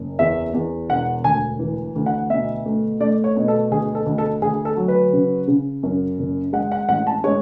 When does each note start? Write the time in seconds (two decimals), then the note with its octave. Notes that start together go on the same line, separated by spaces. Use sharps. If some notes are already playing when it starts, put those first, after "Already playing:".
Already playing: F#1
0.19 E2 E5
0.54 E2
0.89 E1 F#5
1.24 D2 G#5
1.59 E3
1.96 D2
2.06 F#5
2.30 B2 E5
2.66 A3
3.00 A3 D5
3.24 C#5
3.37 B2
3.48 A4
3.71 D2 G#4
3.95 A4
4.06 D2
4.18 A4
4.42 D2 G#4
4.65 A4
4.77 F#3
4.88 B4
5.13 C#3
5.48 C#3
5.83 F#2
6.19 F#1
6.53 G#3 F#5
6.72 F#5
6.89 A1 F#5
7.07 A5
7.24 G#3 C#5